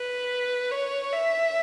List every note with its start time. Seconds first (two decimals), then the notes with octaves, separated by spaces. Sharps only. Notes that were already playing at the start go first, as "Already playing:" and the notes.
Already playing: B4
0.71 C#5
1.13 E5